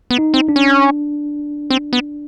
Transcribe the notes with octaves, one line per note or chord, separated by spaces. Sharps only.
B3
D#4
C4
D4
C#4
C4
B3